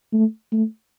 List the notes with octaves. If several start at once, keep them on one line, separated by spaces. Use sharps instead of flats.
A3
A3